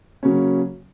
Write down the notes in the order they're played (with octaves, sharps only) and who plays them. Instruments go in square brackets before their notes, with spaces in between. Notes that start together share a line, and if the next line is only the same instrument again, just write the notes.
[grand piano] C#3 F#3 A#3 C#4